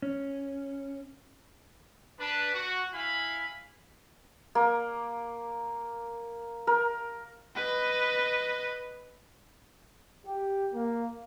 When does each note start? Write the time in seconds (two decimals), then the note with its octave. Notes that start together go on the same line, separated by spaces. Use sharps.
0.02 C#4
2.19 D4 B4
2.53 F#4
2.93 E4 F5 G#5 B5
4.55 A#3
6.67 A#4
7.56 B4 D#5
10.26 G4
10.74 A#3